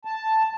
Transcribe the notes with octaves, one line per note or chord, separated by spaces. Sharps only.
A5